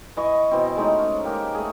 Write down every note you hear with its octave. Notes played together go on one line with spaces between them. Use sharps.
E3 D#5 C#6
B2 E3 C4
G#3 A3 D#4 C#5
C#4
A#3 G4 A#4
A3 G#4